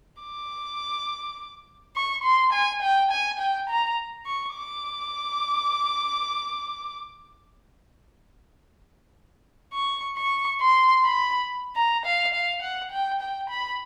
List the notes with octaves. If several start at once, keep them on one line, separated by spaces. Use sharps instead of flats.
D6
C#6
C6
G#5
G5
G#5
G5
A#5
C#6
D6
C#6
C#6
C6
B5
A#5
F5
F5
F#5
G5
G5
B5